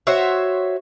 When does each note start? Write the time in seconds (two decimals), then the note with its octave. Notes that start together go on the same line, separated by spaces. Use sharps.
0.07 F#4 C5 C#5 E5